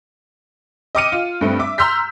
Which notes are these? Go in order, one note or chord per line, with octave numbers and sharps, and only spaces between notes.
D#5 G5 D6 F6 C#7 D#7
F4
G2 A3 C4
E5 D6
A#5 C6 E6 F6 G6 B6